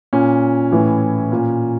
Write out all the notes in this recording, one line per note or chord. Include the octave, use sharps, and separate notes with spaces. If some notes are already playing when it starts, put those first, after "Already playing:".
A#2 C#4
A2 E3
A#2